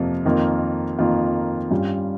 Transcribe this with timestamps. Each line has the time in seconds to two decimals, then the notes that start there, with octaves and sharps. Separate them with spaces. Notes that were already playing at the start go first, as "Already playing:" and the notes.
Already playing: F2 C3 F3 A#3
0.25 F2 D#3 A#3 F4
0.98 F2 D#3 A#3 F4
1.71 G2 G3 C#4 F4